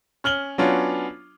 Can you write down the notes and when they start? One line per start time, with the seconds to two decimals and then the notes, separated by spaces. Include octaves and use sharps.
0.24 C#4 F6 F#7 G7
0.58 F#3 B3 C#4 D4 F4